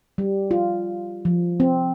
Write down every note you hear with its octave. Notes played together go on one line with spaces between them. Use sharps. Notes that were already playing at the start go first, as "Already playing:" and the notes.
G3
F4
F3
C4